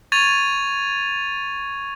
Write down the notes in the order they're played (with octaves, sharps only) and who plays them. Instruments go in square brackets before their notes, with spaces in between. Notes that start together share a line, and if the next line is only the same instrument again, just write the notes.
[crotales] C#6 G#6 A6 D#7 F7